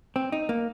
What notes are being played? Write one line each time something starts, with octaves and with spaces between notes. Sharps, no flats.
C4
D#4
A#3